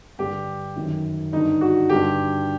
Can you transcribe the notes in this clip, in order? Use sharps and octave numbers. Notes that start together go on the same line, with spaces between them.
G2 D3 G4
F#2 D#3
G2 D3 D#4
F#4
G2 D3 G4